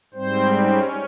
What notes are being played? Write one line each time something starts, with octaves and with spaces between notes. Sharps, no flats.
G#2 G3 C4 C5
C#4